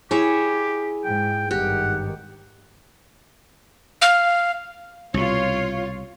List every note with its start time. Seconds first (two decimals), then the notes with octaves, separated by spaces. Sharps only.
0.11 E4 G4 G#4 C#5 E5
1.05 G#2 G5
1.51 G#1 G2 D#3 G4 F#5
4.02 F5
5.14 C2 B2 F4 C#5